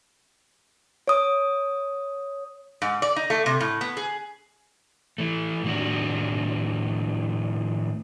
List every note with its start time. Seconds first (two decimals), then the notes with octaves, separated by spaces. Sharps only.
1.08 C#5 D#6
2.82 G#2
3.02 D5
3.16 D#4
3.30 A3
3.46 C3
3.60 A2
3.81 B3
3.97 G#4
5.18 E3 A3
5.64 A2 D#3 G3 D4 F#4